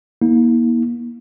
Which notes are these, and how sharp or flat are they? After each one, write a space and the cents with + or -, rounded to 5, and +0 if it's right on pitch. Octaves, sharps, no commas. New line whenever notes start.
A#3 +30 E4 -45